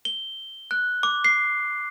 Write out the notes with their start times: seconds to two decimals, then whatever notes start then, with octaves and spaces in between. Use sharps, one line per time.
0.05 G7
0.71 F#6
1.03 D6
1.25 C7